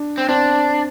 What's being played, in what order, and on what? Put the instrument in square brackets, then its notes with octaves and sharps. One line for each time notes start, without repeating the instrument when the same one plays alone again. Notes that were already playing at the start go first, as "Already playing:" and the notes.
Already playing: [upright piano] D4
[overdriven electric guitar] C4
[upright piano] C4 [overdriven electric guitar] D4